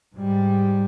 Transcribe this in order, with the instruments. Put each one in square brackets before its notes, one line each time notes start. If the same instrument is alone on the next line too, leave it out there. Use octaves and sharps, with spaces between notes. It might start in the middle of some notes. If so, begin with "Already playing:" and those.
[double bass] G#2 G3